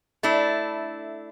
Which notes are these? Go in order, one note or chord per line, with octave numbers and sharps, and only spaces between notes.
A3 D4 E4